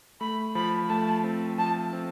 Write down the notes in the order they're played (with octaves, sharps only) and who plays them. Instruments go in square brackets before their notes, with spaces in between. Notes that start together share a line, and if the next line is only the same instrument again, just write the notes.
[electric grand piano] A3 [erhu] B5
[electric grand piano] F3 [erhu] B5
[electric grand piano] A3 [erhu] A5
[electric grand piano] C4
[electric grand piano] F3 [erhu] A5
[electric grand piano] C4